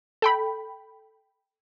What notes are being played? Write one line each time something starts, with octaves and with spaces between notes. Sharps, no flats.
A4 G5 B5